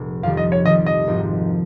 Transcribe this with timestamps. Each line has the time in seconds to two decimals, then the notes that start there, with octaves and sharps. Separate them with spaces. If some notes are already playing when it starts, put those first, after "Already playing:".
Already playing: F1 C2 A#2 G#3
0.23 F2 D#3 G3 F5
0.37 D#5
0.52 C#5
0.66 F2 D#3 G3 D#5
0.86 D#5
1.07 G#1 G#2 F3 C4 D#4